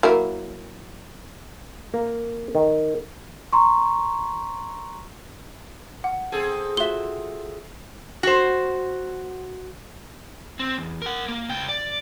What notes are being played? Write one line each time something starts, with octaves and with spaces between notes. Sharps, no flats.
F#3 A#3 E4
A#3
D#3
A#5 C6 C#6
F#5
C4 G#4 A4
F4 F#4 E5 G7
F#4 C5
C4
E2
A#4 F#5
A#3
C#2 G5
D5